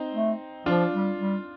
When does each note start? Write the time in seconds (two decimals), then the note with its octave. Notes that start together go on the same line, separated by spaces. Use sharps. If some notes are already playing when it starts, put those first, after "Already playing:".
Already playing: C4 D#4
0.14 A3
0.66 F3 D4 F4
0.93 G3
1.19 G3